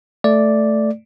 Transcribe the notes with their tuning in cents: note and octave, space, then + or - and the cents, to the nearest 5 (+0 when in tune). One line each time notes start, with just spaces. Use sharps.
A3 +0 D5 +0